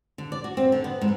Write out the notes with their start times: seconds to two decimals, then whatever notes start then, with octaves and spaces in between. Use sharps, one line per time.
0.18 D3
0.32 D5
0.44 F#4
0.57 C4
0.72 D3
0.84 B3
1.02 G#2